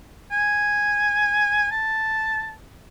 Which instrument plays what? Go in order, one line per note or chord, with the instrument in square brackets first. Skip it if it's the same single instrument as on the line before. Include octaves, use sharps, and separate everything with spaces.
[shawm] G#5
A5